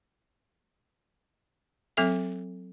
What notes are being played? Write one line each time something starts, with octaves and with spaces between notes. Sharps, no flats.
F#3 C4 A4 E5